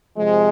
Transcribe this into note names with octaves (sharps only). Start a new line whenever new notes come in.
C3 F3 G#3